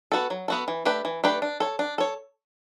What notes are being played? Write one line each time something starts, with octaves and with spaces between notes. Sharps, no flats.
B3 F#4 A4
F#3
B3 F#4 A4
E3
A3 D4 G4 B4
E3
A3 D4 G4 B4
D4
A4 C#5
D4
A4 C#5